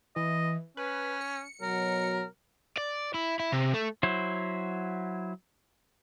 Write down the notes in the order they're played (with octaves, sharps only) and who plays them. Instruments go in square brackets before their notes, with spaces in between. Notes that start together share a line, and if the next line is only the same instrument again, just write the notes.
[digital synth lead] E3 [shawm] D#5
[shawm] C#4 [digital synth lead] B4
[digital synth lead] C#7
[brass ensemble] B2 F#3 [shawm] A#4
[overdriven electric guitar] D5
E4
E4
C3
A3
[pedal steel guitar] F#3 E4 C5